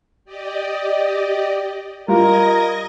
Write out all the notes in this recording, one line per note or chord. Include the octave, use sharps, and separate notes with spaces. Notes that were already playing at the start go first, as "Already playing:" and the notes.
G4 D5 D#5
G3 F4 A#4 D#5 G#6 A#6